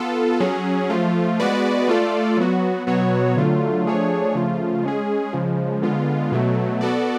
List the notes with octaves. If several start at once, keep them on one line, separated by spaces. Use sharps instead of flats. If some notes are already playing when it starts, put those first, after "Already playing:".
Already playing: B3 F4 A4
F#3 C#4 G#4
F3 A3 F4
G#3 B3 F#4 B4 D5
A3 F4 A4 D5
F#3 B3 F#4
B2 F#3 B3 F#4 C#5
D3 F#3 A3 F4
F3 A3 D4 G#4 C#5
C#3 F3 A3 F4
G#3 C#4 G#4
C#3 F3 G#3
D3 G#3 B3 F4
B2 F#3 A3
B3 F#4 A4 D5